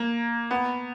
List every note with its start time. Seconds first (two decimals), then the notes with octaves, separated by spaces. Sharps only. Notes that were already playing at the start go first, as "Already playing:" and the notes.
Already playing: A#3
0.51 B3